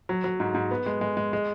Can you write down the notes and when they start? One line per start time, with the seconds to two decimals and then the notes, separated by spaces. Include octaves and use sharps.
0.09 F#3
0.24 F#3
0.40 G#2
0.54 G#2
0.71 B3
0.86 G#3
1.01 G#3
1.17 G#3
1.33 G#3